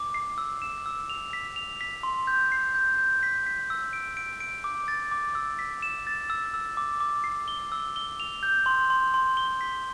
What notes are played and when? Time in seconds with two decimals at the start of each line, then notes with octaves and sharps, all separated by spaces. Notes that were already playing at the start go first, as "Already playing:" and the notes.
Already playing: D6
0.14 C7
0.38 E6
0.62 E7
0.86 E6
1.10 F7
1.33 B6
1.56 F7
1.81 B6
2.03 C6
2.27 G6
2.52 C7
2.75 G6
2.98 G6
3.23 B6
3.46 B6
3.70 E6
3.93 D7
4.17 D7
4.40 D7
4.64 D6
4.88 A6
5.11 D6
5.35 E6
5.59 B6
5.82 E7
6.07 A6
6.30 E6
6.54 E6
6.77 D6
7.00 D6
7.24 C7
7.48 G7
7.72 E6
7.96 G7
8.20 F7
8.43 G6
8.66 C6
8.90 C6
9.14 C6
9.37 G7
9.61 B6